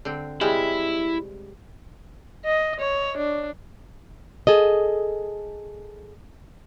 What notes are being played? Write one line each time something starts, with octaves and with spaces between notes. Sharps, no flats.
D3 C4
C3 G3 G#3 E4
D#5
C#5
D4
G#4 A4 D#5